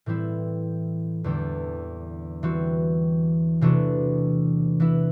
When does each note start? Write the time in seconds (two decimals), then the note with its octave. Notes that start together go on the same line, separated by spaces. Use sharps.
0.06 A2 E3 G3 C4 E4
1.24 E2 D3 G3 D4
2.43 E3 G3 C4 F#4
3.61 C3 E3 A3 D4 F#4
4.80 E3 B3 E4